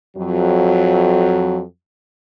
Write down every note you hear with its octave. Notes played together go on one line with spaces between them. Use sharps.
F2 F#3